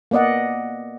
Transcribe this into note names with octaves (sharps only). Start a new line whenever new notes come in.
A#3 B3 D5 D#5 F#5